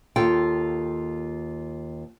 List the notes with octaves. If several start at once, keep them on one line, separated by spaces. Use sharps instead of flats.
D#2 F4 A4 G5